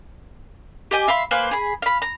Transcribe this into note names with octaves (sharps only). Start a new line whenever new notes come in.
G4 D#5 G#5
E5 F5 B5 C6
A#3 B4 C5 G#5
G#4 B5
F5 B5
A#5